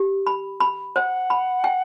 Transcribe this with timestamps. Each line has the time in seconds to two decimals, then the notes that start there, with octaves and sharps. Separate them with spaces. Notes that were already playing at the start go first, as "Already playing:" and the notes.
Already playing: G4
0.27 B5
0.60 B5
0.95 C5 F#5
1.30 B5
1.64 G5